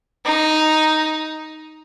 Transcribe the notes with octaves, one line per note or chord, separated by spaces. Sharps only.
D#4